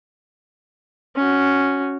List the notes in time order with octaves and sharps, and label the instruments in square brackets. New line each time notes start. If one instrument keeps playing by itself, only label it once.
[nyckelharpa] C#4 F#4